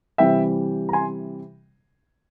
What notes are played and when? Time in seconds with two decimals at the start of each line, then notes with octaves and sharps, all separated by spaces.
0.18 C3 E3 G3 C4 E5 G5
0.89 A#5
0.93 G#5 C6